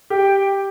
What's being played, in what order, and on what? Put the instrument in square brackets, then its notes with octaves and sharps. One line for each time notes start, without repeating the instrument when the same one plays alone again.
[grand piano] G4 [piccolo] G5